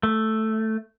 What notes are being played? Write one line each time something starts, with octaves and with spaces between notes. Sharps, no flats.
A3